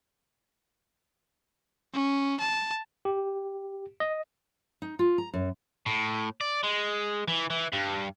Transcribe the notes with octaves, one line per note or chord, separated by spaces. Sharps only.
C#4
A5
G4
D#5
D#4
F4
A#5
F#2
A2
D5
G#3
E3
E3
G2